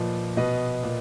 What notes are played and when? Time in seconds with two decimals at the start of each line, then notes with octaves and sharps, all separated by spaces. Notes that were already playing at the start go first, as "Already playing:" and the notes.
Already playing: A#2 F3 B4 D#5
0.37 B2 B4 D#5
0.83 A#2